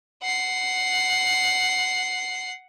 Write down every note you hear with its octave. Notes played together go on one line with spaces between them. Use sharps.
F#5 C7